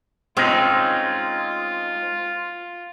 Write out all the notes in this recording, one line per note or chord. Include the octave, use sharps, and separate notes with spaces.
G#3 C4 C#4 D#4 F4